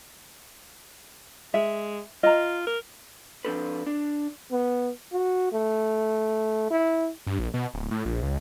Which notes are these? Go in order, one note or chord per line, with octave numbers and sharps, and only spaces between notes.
G#3 E5
F4 D#5 A#5
A#4
F3 C4 D4 A4 B4
D4
B3
F#4
A3
E4
G2
A#1
B2
D1
A2
A#1
C#2